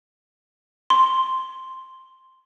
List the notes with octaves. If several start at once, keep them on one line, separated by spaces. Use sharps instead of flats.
C6